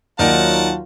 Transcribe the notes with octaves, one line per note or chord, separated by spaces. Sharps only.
D#2 F#3 D#4 F4 A#4 D5 F#5 A5